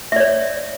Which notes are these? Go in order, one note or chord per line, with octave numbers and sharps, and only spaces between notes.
C#5 D5 E5